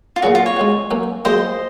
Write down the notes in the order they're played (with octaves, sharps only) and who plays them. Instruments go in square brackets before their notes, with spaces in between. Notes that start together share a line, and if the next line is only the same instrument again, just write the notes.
[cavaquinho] F4
[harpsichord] A#2 F#3 C#4 G#4 [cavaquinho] F#4
[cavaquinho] F4
C#5
[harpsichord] G#3 C#4 F#4
F#3 A#3 C#4 F#4
[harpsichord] F#3 A#3 F4 G#4 [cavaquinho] C5 D#5